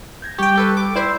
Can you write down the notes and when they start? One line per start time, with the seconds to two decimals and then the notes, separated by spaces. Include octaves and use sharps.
0.22 G6 G#6 A#6
0.38 G3 G4 G5 C#6
0.56 G4 A4 B4
0.77 D6
0.96 E4 B4 C5 D5 E5